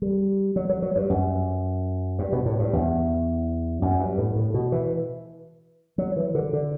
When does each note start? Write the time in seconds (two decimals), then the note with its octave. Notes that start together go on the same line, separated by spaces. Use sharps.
0.02 G3
0.56 F#3
0.69 F#3
0.82 F#3
0.96 G2
1.10 F#2
2.19 G2
2.32 B2
2.46 A2
2.59 G2
2.73 E2
3.82 F#2
4.00 G2
4.18 A2
4.36 A2
4.54 B2
4.72 E3
5.98 F#3
6.16 E3
6.35 D3
6.53 D3